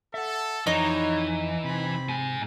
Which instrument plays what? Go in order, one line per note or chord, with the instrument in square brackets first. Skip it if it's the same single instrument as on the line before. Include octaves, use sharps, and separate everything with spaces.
[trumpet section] A4 [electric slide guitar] E5 F#5
[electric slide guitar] F2 [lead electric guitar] E3 [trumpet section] G3 C#5 [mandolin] D#4
[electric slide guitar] C3 [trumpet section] C4 B5
[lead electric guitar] G#2 G#5